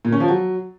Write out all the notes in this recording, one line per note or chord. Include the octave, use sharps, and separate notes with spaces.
A#2
C#4
F3
F#3